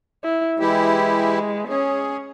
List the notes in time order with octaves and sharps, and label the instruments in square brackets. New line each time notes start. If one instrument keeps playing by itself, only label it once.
[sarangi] E4
[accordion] E3 E4 G4 [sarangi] G#3
[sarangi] C#4 [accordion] G#4